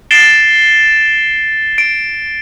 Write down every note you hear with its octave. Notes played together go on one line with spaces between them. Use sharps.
A6 C7 D7 E7 G7
D7